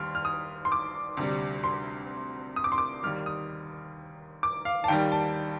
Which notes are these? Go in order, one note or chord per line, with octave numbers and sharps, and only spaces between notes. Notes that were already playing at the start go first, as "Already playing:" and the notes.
Already playing: D#2 G3 C6 F6
F6
D#6
C6
D6
D2 C3 G3
C6
D#6
D6
C6
D6
D#2 D#3 G3 F6
D#6
D6
F5
A5
D#2 D#3 G3 G5
A5